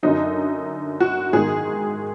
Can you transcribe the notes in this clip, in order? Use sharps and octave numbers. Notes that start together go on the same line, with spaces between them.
F#2 D3 F#3 D#4
F#4
G#2 D#3 G#3 G#4